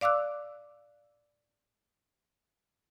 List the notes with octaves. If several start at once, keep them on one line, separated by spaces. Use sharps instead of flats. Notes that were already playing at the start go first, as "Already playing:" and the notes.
D5 F5 D6 E6 F#6